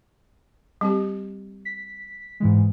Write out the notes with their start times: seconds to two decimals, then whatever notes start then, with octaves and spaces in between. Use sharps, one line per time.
0.81 G3 C4 G4
1.65 B6
2.40 G#2 E3 G#3